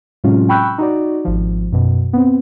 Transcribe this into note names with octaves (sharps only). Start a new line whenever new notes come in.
A2 C3 F#3 G#3 C#4 F4
G5 B5 C#6 E6 F#6 G6
D#4 F#4 D5
G#1 F3
F#2 B2
B3 C4